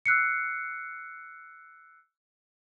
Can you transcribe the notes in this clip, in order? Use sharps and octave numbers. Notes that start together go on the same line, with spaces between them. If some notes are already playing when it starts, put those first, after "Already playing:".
E6 F#6 C7 C#7